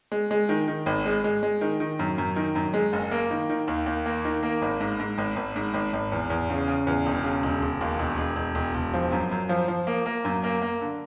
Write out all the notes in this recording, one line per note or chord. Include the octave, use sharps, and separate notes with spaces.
G#3
G#3
D#3
D#3
G#1
G#3
G#3
G#3
D#3
D#3
F#2
F#2
D#3
F#2
G#3
F#1
A#3
D#3
D#3
D#2
D#2
A#3
D#3
A#3
G#1
G#2
G#2
G#1
G#1
G#2
G#1
G#1
E2
E2
C#3
C#3
E2
E1
C#3
E1
E1
D#2
E1
E1
E1
E1
E1
F3
F#2
F#2
F3
F3
A#3
A#3
F#2
A#3
A#3
D3